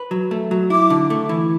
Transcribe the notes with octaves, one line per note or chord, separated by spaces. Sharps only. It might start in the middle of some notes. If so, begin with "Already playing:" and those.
Already playing: B4
F#3
A3
F#3
E4 D6
D3
A3
E3